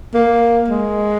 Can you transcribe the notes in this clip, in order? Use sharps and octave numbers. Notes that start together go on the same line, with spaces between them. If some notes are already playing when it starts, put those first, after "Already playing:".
A#3
G#3